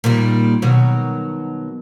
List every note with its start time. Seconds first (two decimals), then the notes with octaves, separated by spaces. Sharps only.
0.04 A#2 D#3 G3
0.62 B2 D#3 F#3